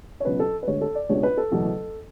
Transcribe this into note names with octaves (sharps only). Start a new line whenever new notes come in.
C#5
C#2 B2 F#3 C#4 B4
A4
B4
D2 D3 G#3 C#5
A4
D5
C#2 B2 G#3 D4 C#5
B4
A4
F#1 E2 B2 F#3 A3